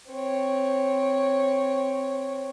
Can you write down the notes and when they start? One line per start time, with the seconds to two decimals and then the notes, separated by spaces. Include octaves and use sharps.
0.10 C4 C#5